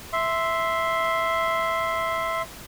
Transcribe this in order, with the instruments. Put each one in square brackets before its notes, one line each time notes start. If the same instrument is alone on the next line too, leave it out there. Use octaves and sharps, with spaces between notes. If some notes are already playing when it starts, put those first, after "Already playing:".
[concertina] E5 C6